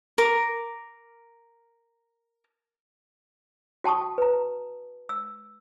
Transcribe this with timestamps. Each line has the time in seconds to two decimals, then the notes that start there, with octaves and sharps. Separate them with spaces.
0.18 A#4 D6
3.84 F#4 G5 A5 C#6 D#6
4.18 B4 A#5
5.09 E6